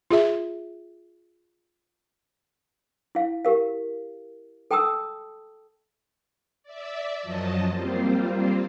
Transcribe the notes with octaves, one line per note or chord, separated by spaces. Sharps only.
F4 G#4 E5
E4 F5
G4 A#4 F5
A4 G5 A5 A#5 D#6 E6
D5 E5
F#2 F3 F#3 D#5 A5
G3 A#3 C4 F4 C5